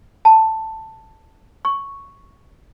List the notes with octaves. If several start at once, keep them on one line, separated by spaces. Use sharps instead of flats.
A5
C#6